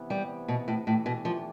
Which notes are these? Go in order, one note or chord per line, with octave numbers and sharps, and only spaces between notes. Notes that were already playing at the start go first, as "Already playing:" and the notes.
Already playing: C3 E3 B3
G3
B2
A2
A2 E3 A3 D4 G4
B2
F3